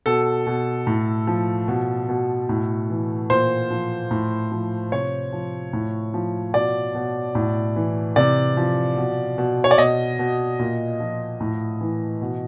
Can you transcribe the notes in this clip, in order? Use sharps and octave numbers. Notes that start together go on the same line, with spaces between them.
B2 A4
B2
A2
F3
B2
B2
A2
E3
A#2 C5
F3
A2
F3
C3 C#5
F3
A2
F3
B2 D5
B2
A2
E3
C3 D5
F3
B2
B2
C#5
D5
B2 D#5
B2
A#2
F3
A2
E3
B2